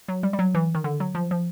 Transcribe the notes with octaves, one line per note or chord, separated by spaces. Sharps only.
F#3
G3
G3
F#3
E3
D#3
D3
F#3
F3
F3